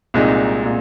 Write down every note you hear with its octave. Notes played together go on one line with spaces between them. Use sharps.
C2 A#2 G#3 D#4
A#2